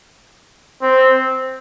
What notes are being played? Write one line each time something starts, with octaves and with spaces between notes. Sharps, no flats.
C4